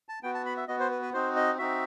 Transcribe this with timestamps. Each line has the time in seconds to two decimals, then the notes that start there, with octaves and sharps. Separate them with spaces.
0.09 A5
0.23 B3 F#4 G5
0.34 A5
0.46 B5
0.57 E5
0.68 B3 F#4 D#5
0.80 C5
0.91 B4
1.02 B4
1.14 C4 D#4 F#4 C5
1.36 D#5
1.59 C4 D#4 F#4 E5